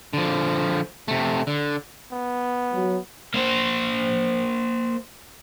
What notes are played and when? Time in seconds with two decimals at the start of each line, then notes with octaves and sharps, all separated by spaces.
0.13 D3 F3
1.08 C3 A3
1.47 D3
2.12 B3
2.73 F#3
3.34 A#3 C5